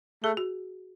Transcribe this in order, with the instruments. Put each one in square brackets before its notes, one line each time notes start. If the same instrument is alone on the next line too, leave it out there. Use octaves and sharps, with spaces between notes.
[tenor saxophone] A3 [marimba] G#4
[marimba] F#4